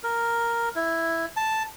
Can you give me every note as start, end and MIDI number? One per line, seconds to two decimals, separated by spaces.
0.04 0.69 70
0.75 1.26 64
1.36 1.63 81